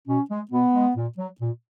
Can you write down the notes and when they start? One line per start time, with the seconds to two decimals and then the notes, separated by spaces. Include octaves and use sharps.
0.08 B2 C#4
0.31 G#3
0.52 B2 B3
0.74 G#3
0.97 A#2
1.18 F#3
1.41 A#2